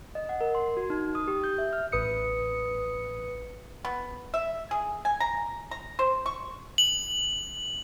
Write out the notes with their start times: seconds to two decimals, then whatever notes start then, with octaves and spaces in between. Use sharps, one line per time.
0.15 D#5
0.29 F#5
0.41 A#4
0.55 C6
0.77 F#4
0.90 D#4
1.15 D#6
1.28 G4
1.44 G6
1.58 E5
1.73 F6
1.92 A1 B4 D#6 C#7
3.85 B3
4.34 E5
4.71 G#4
5.05 G#5
5.20 A#5
5.71 A#5
5.99 C5
6.26 C#6
6.78 F#7